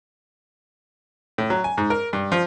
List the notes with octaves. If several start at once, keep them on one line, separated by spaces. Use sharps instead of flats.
A2
F#3
G#5
G#2
A#4
G2
F3